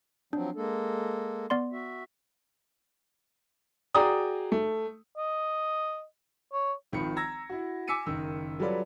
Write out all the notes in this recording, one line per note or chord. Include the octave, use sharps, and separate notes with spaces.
F3 F#3 C4 D4
G#3 A#3 A4
B3 D5 C6
F#4 E5
F#4 G#4 D5 G5 A#5 D#6
A3
D#5
C#5
G#1 D#3 F3 B5 C#7
A#5 E6 G#6 A#6
E4 F#4
G#5 D6 E6 B6 C#7 D#7
F#1 D#3 E6
F#3 G3 F4 A4 B4 D5